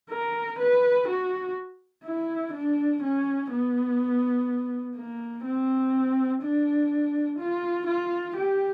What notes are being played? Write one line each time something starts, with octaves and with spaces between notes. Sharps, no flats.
A#4
B4
F#4
E4
D4
C#4
B3
A#3
C4
D4
F4
F4
G4